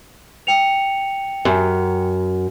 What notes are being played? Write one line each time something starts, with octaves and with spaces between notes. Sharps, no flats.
G5 C#7 F7
F#2